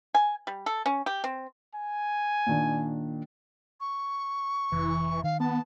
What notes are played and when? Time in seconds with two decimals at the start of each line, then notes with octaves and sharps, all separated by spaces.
0.15 G#5
0.47 G3
0.66 A4
0.86 C#4
1.06 G4
1.24 C4
1.75 G#5
2.47 A#2 D#3 D4
3.81 C#6
4.72 F1 E3
5.24 D#3 F5
5.40 B3 A5